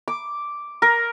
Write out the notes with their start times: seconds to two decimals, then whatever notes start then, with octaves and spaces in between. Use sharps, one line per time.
0.08 D6
0.82 A#4